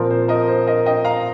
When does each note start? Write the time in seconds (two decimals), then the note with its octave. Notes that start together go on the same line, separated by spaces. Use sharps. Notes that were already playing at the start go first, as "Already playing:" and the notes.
Already playing: A#2 F3 C4 A#4
0.10 C5
0.28 A#4 D#5
0.48 C5
0.67 A#4 D#5
0.86 D#5 G5
1.04 F5 A#5